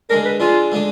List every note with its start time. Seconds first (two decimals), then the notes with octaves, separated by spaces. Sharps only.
0.10 D3 G#3 D4 A#4
0.25 B4
0.40 D3 G#3 D4 F4
0.72 D3 G#3 D4